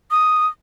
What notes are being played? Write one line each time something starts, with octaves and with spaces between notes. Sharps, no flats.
D#6